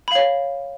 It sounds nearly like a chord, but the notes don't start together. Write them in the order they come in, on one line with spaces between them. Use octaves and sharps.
B5 F5 C#5